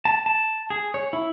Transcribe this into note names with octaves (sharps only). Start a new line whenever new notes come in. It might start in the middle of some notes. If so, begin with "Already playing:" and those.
A5
A5
G#4
C#5
E4